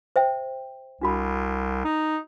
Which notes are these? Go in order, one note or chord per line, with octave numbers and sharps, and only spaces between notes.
C5 E5 G5
C2 D4 F#4 B5
D#4